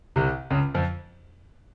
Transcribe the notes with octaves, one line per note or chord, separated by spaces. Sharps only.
C2 C3
C#2 C#3
F2 F3